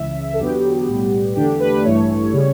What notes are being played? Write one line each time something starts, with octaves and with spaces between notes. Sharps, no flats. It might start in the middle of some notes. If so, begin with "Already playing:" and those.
Already playing: C#2 C#3 E3 E5
A4
E2 D3 F#3 B3 G4
B1 A2 G3 B3
E2 D3 A3 D4 G4
B4
A1 G2 E3 A3 C#5
C#3 G3